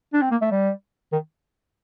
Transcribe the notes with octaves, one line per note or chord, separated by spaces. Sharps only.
D4
C4
A#3
A3
G3
D#3